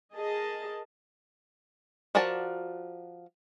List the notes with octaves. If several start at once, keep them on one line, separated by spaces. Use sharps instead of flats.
G#4 A#4 D#5 A5
F3 F#4 A#4 D5 A5